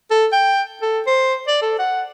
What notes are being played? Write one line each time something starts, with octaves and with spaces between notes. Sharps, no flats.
A4
G5
A4
C5
D5
A4
F#5